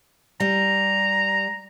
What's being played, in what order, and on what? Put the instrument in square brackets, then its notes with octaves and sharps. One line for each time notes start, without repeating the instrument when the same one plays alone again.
[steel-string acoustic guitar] G3 [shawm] A#5